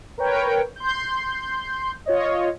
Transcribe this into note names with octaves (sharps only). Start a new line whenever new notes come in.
A#4 B4 C#5 G5
C6 G6
F4 C#5 D#5